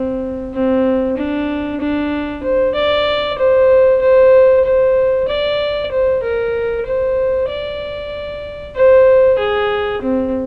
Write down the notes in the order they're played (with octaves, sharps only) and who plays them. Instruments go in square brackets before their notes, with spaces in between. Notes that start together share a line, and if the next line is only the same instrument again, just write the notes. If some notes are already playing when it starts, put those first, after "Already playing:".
Already playing: [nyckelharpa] C4
C4
D4
D4
C5
D5
C5
C5
C5
D5
C5
A#4
C5
D5
C5
G#4
C4